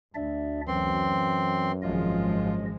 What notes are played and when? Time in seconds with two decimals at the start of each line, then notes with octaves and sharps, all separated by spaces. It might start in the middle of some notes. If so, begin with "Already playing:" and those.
0.15 D2 D4 D5 E5
0.68 F#2 E3 C4 C6
1.82 G#1 F3 G#3 F4 D#5